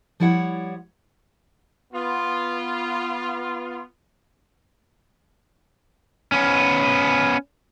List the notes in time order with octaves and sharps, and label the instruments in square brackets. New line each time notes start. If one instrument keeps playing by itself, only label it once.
[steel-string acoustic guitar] F3 G3 E4 C#5 F#5
[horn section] B3 F4
[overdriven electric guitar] B3 C#4